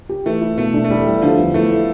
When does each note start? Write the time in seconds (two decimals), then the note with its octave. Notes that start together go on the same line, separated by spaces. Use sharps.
0.09 G4
0.26 E3 A3
0.41 E4
0.57 B2 A3
0.74 D4
0.84 A3
0.90 E2 G3
1.06 G3
1.22 D3 F3
1.38 E2
1.54 E2 A3
1.70 A3